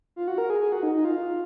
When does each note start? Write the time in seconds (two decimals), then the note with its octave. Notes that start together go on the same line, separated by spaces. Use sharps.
0.16 F4
0.28 F#4
0.38 A#4
0.50 G#4
0.61 G#4
0.72 F#4
0.83 D#4
0.95 D#4
1.05 F4